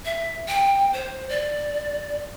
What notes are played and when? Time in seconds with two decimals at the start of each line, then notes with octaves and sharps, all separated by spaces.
0.05 E5
0.48 G5
0.93 C5
1.29 D5